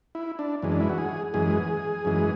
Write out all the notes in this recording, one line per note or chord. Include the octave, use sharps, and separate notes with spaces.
E4
D4
F#2 E3 G#3
D4
E4
F#4
G#4
F#2 E3 G#3 G#4
F#2 E3 G#3